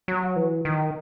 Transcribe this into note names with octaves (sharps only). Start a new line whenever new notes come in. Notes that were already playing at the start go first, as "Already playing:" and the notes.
F#3
E3
D#3